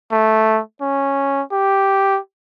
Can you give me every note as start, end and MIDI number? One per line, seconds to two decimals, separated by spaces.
0.12 0.61 57
0.81 1.43 61
1.52 2.19 67